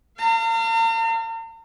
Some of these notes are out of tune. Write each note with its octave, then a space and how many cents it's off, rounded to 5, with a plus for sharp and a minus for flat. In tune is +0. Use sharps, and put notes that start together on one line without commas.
F5 -25 A#5 -45